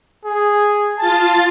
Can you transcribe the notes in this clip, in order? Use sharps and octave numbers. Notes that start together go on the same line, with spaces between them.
G#4
F4 A5 A6